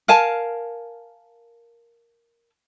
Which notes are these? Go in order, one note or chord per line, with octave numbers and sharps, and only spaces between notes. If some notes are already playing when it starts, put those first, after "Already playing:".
A#4 F5 G#5 A5